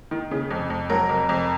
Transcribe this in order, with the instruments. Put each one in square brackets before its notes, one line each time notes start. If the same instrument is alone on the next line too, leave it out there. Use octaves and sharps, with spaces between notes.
[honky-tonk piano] D#3
C#3
F2
F2
F#3 A#4
F2
F2